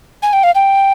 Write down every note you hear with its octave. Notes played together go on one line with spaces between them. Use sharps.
G#5
G5
F5
G5